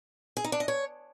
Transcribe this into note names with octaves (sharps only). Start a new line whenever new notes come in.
G#4
D#4
D4
D#5
C#5